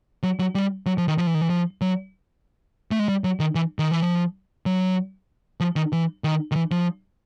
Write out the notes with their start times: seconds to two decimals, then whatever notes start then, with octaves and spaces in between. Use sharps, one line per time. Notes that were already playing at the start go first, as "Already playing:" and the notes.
0.23 F#3
0.39 F#3
0.55 G3
0.86 F#3
0.98 F3
1.08 D#3
1.18 F3
1.27 E3
1.35 D#3
1.41 E3
1.50 F3
1.81 F#3
2.91 A3
2.99 G#3
3.09 G3
3.24 F#3
3.40 D#3
3.55 E3
3.79 D#3
3.91 E3
4.02 F3
4.66 F#3
5.60 F3
5.76 D#3
5.93 E3
6.24 D#3
6.52 D#3
6.56 E3
6.71 F3